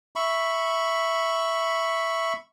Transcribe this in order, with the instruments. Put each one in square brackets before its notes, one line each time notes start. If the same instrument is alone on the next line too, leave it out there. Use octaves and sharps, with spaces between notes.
[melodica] E5 B5 C#6